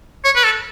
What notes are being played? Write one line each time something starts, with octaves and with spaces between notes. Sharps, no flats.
C#5
B4
A4